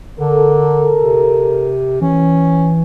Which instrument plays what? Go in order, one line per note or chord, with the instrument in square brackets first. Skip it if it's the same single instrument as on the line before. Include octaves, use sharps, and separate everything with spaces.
[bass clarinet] D3 [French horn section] A4 A#4
[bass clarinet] C3
[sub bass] E3 [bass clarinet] C#4